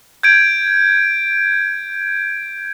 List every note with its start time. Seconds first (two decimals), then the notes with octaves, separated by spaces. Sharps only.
0.23 G6 G#6 D7